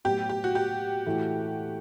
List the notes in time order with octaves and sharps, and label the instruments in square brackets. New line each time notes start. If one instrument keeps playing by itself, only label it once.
[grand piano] A2 F#3 B3 E4 [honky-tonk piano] G4
[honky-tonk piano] G4
F#4
G4
[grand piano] A2 E3 A3 E4